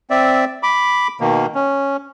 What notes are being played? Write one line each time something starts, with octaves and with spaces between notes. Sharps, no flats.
C4 D5 E5
B5 D6
B2 D#3 A#3
C#4